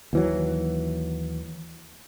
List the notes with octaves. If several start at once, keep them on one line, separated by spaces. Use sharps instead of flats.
D#2 E3 F#3